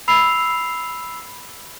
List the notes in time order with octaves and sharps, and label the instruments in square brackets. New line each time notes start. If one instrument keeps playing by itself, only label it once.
[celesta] B5 E6 C7 F7